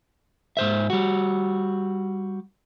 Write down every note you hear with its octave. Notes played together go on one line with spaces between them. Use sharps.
G#2 C5 E5
G3 F#4